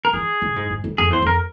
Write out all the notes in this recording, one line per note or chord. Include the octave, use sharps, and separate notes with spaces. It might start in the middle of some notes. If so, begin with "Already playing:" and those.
A#4
E3 G#4
E3
A#2
G#2
G#2
F2
F2 G#4
E2 C5
F2 A#4